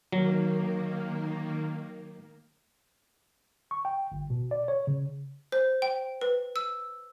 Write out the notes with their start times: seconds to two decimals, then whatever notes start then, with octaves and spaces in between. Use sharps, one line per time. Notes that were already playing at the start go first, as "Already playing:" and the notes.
0.12 D#3 F#3 A#3
3.71 C#6
3.85 G5
4.12 G1
4.30 B2
4.51 D5
4.68 C#5
4.87 C#3
5.52 C5
5.82 G5
6.21 B4
6.56 E6